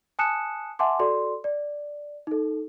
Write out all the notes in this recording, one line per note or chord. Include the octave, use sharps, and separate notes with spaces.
G#5 A5 D#6 F#6 C#7 E7
E5 F#5 G#5 A5 C6 D6
F#4 A4 D5 C6
D5
D#4 A4